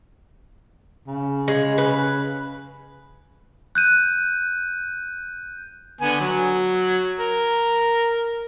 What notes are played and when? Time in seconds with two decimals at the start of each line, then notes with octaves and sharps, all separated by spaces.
1.07 C#3
1.48 G#3
1.78 B4
3.75 F#6 G6 D#7
6.01 D3 B3 G#5
6.20 F#3
7.19 A#4